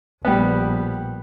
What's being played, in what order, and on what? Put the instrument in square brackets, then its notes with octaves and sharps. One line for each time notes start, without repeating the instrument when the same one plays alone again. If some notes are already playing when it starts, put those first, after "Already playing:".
[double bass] A#1 [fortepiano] G3 B3